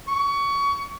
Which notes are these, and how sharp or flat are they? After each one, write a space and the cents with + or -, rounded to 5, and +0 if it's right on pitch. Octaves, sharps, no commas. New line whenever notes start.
C#6 +25